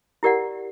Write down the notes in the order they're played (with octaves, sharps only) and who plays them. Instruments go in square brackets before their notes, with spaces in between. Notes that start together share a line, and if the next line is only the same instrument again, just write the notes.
[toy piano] E4 G4 A#4 D5 F#5